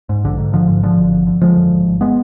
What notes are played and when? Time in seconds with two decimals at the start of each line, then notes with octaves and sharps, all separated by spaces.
0.09 G#2
0.24 A#1 D3
0.38 G#2
0.53 G#1 D3 F3
0.68 G#2
0.83 G#2 D3 F3
0.98 G#1
1.12 D3
1.27 D3
1.41 D3 F3 G#3
1.57 F2
1.71 G#1
1.87 G#1
2.01 G#3 B3